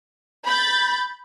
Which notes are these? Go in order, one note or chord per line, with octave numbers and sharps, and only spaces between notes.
B5 G6 A6